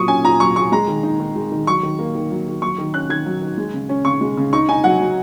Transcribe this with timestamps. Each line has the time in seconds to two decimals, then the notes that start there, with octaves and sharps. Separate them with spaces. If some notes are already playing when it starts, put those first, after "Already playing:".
Already playing: A#2 F#3 C#6 D#6
0.08 C#4 G#5
0.25 A#2 A#5
0.40 F#3 C#6
0.56 A#2 C#6
0.72 G#3 A#5
0.88 D#3
1.03 D#4
1.20 D#3
1.35 G#3
1.52 D#3
1.67 F#3 C#6
1.83 D#3
1.99 A#3
2.15 D#3
2.31 F#3
2.46 D#3
2.62 F#3 C#6
2.78 D#3
2.94 C#4 F#6
3.10 D#3 G#6
3.26 F#3
3.42 D#3
3.58 G#3
3.74 C#3
3.89 C#4
4.05 C#3 C#6
4.21 G#3
4.37 C#3
4.53 D#4 C#6
4.69 D#4 G#5
4.84 F#3 F#5
5.00 F#3